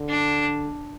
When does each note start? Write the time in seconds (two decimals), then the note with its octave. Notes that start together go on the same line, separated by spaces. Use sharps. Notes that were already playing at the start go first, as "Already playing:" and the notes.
Already playing: D3
0.08 D4